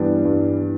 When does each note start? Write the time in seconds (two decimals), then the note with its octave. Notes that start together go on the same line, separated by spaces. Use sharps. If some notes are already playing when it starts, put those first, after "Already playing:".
Already playing: G2 E3 G3 B3 D4
0.25 G2
0.61 E3